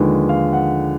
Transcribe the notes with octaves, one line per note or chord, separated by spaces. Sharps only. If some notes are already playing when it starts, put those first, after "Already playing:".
Already playing: D#2 D3 F3 G#3 B4
F5
F#5